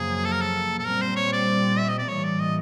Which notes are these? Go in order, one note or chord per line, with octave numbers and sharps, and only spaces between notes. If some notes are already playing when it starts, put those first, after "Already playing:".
Already playing: F#2 C#3 F3 A#3 G#4
A4
A#4
A4
A4
A#2 G3 C4 A#4
C5
C#5
D5
E5
D#5
D5
A2 E3 G3 A#3 C#5
D5
D#5